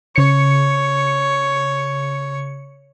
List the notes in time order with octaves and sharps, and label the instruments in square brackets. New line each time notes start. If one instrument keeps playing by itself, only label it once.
[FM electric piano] C#3 C#7 [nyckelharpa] C#5